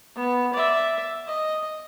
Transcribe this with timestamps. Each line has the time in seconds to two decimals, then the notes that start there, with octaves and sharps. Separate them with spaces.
0.15 B3
0.53 D5 E5
1.27 D#5